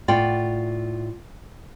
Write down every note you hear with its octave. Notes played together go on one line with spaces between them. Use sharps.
A2 F4 D5 F#5 G5